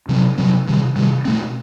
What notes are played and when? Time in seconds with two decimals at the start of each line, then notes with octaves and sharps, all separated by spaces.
0.09 C3 F#3 C4
0.38 C3 F#3 C4
0.67 C3 D#3 G3
0.96 C3 D#3 G3
1.25 B2 A3 C4